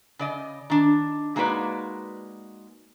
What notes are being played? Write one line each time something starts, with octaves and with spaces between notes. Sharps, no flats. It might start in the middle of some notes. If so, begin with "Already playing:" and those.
C#3 D5 D#5
D#3 D4
G#3 A#3 D#4 F#4 B4 D5